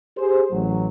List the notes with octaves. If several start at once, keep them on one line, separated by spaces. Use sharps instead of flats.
G4 G#4 C5
A1 F#3